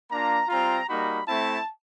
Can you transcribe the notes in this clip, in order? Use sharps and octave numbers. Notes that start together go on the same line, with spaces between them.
A#3 D4 F4 A#5
G3 C4 F4 A#5
G3 A#3 D#4 F#4 B5
A3 C4 E4 A5